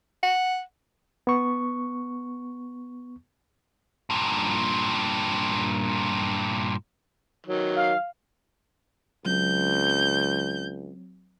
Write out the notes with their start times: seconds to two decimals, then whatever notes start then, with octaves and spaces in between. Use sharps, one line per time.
0.23 F#5
1.27 B3 C#6
4.10 G2 A#2
7.46 D#3 F#3
7.76 F5
9.26 C#2 F#3 C4 G6